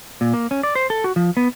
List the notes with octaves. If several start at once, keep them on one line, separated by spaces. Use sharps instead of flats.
A#2
A#3
C#4
D5
C5
A4
F#4
F3
B3